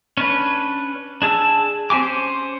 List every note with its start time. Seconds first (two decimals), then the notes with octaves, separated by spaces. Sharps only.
0.17 C#4 D4 B4
1.22 D4 G#4 A5 E6
1.90 C4 G4 G#5 D6
2.03 C#4 C5